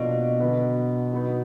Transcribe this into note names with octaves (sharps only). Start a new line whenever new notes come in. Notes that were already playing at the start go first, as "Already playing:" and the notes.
Already playing: B2 F3 A#3 D4 F#4 D5
D3 F#3 B3
F#3 B3 D#4